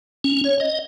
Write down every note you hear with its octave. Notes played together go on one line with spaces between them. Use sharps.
C#4
C#5
D#5